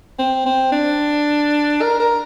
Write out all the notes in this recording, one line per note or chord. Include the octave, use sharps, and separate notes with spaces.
C4
C4
D4
A#4
A#4